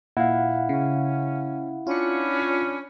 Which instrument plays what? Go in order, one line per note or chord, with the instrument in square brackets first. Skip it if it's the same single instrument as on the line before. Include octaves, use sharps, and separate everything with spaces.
[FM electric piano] A#2 [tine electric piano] E4 [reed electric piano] F5 F#5
[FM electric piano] C#3 [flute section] C#4
[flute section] C#4 D4 B5 [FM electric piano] F4 C#7